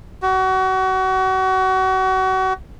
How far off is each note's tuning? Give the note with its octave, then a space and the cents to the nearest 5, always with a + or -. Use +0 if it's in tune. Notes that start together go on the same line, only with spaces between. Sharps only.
F#4 +30